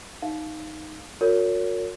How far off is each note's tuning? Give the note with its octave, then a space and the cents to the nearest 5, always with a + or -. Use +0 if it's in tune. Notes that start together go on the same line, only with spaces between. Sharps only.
D#4 +0 F5 +0
F#4 -35 A#4 -25 C#5 +20